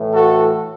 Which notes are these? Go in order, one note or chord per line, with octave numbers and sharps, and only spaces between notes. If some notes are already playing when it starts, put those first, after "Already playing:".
Already playing: A2 E3
F#4 A4